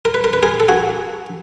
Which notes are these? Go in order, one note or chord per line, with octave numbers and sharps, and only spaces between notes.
A#4
B4
A#4
B4
G#4 A#4
A4
F#4 G#4